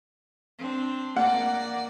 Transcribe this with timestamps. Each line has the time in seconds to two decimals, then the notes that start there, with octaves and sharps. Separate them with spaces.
0.59 C4 D4
1.17 A#3 D5 F#5